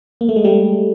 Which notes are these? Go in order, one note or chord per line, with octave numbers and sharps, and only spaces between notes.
A#3
A3
G#3
G3 A3